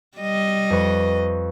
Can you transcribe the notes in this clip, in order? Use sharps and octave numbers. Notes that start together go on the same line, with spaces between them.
G3 D#5
F2 B4 C#6